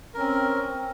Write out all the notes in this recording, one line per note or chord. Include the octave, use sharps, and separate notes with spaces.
C4 C#4 A#4